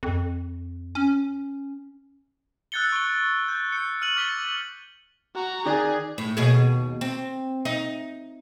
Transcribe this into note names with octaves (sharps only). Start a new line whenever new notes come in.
F2
C#4
E6 F#6 G6 A6 C#7 G7
C#6 G7
G6 A6
G6 C#7
F6 D#7 F#7
D6 A6 B6 C#7 G7
F#4 A#5
D#3 G#4 D5 F#6
A2
D#2 B2 G#4
C4
D#4